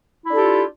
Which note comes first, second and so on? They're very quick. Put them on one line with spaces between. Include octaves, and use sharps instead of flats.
E4 D4 A4 G4 F4